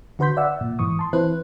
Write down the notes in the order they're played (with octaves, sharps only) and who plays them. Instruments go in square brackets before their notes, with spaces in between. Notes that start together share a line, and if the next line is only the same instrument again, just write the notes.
[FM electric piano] D3 F#4 B4 C6 G6 B6
D5 E5 F#5 E6
A#2
G#2 E3 C#6 D#6
A5 C6
E3 C4 E4 B4 C5 F#6